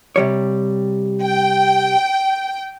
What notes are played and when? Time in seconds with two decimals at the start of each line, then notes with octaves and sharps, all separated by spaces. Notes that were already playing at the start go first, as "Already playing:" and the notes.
0.16 C3 G3 C#5
1.22 G5